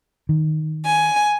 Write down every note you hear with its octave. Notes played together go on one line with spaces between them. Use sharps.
D#3
G#5